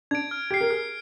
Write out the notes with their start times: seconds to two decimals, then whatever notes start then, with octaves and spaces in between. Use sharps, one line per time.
0.11 D4 G#6 D7
0.31 F6
0.51 G4 G#6 C7
0.61 A#4
0.71 G#4 F6